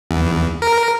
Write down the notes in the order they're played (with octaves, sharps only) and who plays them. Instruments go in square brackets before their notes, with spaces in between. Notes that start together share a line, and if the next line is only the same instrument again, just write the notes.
[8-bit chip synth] E2
A#4